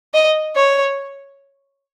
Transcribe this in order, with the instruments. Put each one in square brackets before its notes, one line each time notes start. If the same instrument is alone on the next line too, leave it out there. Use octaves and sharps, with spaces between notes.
[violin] D#5
C#5